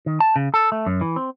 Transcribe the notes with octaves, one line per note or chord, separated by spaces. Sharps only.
D#3
A5
C#3
A4
A3
F#2
E3
C4